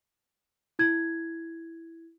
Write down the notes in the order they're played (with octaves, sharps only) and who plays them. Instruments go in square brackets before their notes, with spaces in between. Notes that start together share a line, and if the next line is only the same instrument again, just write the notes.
[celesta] E4 G#6